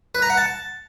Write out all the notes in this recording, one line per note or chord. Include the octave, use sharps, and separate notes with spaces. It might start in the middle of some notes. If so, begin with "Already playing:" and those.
B4
A#5
F#5
A5